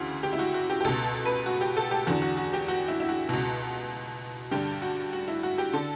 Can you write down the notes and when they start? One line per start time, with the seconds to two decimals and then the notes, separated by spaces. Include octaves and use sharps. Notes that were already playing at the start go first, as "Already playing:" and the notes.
Already playing: D2 C#3 E3 F#4
0.23 G4
0.33 E4
0.39 F#4
0.54 F#4
0.70 G4
0.81 G4
0.84 C#2 B2 A4
1.25 B4
1.46 F#4
1.61 G4
1.77 A4
1.91 G4
2.07 E2 D3 F#4
2.22 F#4
2.37 F#4
2.53 G4
2.68 F#4
2.88 E4
3.00 E4
3.09 F#4
3.29 C#2 B2 F#4
4.51 G2 D3 G4
4.82 F#4
5.13 F#4
5.28 E4
5.43 F#4
5.58 G4
5.73 D3 A4